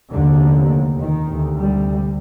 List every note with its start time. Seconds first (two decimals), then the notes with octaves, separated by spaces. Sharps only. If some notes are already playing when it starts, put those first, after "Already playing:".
0.12 F1 D#2 D3
0.99 D#3
1.27 D2 C3
1.57 G3